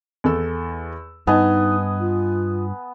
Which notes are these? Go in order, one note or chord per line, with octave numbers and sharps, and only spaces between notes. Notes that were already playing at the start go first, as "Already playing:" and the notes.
E2 A4 E6
G2 B3 D#4 D#5 G#5 A5
F4